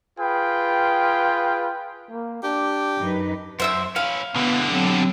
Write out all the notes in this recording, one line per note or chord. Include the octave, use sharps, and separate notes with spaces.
F4 G#4 B4 G5
A#3
D4 G4
F#2 D#4 B4
F#2 C5 E5 E6
C#4 E4 F5
B2 D3 E3 B3
F#3 C4 G4 A4